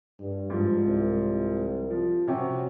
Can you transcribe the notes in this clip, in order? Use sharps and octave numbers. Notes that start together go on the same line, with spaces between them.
G2
G#2 F3
C2
F3
C3 C#4 F#4